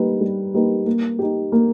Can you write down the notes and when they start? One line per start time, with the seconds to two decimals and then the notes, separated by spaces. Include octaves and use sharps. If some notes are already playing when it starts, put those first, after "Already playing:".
Already playing: G3 A#3 D#4 G4 B4
0.21 G3
0.54 A#3 D#4 G4 B4
0.86 A#3
1.19 D#4 G4
1.52 A#3